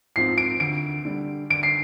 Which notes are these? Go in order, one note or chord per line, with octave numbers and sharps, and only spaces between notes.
G#2 F3 C4 C7
D7
D2 D7
D3 G3
D2 D7
C7